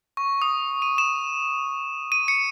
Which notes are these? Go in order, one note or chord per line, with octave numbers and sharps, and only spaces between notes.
C#6
D#6
D#7
E7
D#7
C#7